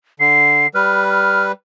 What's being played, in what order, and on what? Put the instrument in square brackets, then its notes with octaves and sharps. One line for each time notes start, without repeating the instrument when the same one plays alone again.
[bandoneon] D3 [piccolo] C7
[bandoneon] G3 B4 [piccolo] F6
[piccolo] F6